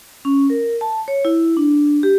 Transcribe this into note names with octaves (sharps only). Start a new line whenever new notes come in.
C#4
A#4
A5
C#5
E4
D4
G4